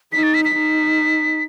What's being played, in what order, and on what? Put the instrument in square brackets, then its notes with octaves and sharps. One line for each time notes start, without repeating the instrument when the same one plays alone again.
[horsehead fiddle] D#4 [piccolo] B6
[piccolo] A6
B6
B6
[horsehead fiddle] D#4